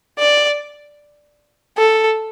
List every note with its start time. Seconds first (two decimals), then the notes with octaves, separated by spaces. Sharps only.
0.19 D5
1.78 A4